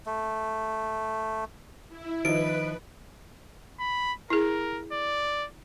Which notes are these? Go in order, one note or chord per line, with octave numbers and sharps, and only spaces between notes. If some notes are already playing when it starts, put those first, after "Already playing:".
A3
E4
D#3 F3 D#4 B4 D7
B5
E4 G#4 A#4
D5